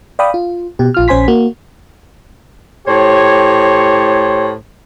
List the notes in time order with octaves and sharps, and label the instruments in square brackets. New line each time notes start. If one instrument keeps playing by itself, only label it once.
[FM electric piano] D5 F5 G5 B5 D#6
F4
B2 G4
A#1 F4 F6
A#1 C#4 C5 G#5 C6 B6
A#3 F#4
[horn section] A2 G4 C5 C#5